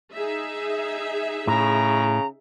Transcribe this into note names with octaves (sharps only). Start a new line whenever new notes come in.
D#4 G#4 E5
A2 C#3 A#5